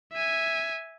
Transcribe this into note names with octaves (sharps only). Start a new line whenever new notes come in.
E5 G#5